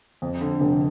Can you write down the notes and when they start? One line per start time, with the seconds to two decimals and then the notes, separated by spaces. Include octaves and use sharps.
0.22 F2
0.41 D3
0.60 F1